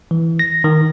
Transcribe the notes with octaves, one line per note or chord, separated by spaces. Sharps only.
E3
A#6
D#3